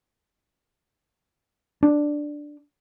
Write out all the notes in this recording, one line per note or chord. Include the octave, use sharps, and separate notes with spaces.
D4